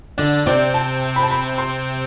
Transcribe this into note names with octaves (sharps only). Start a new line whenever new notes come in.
D3 D4 D5
C3 C4 D5
A5
B5
A5
B5
C6